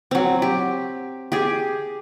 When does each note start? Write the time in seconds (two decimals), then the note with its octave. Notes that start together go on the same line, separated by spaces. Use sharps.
0.11 F#3 C4
0.42 G4
1.32 G4 G#4